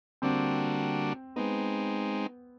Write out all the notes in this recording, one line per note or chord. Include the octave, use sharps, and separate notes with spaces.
D3 G3 A#3 C4 D4 F#4
G#3 B3 C4 D#4